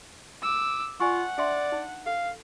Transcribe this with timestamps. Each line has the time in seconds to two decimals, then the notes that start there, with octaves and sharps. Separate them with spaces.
0.42 D6 E6
1.00 F4 D5 F#5 G#5 C#6
1.38 D4 D5 E5 C6
1.72 D#4
2.06 A4 F5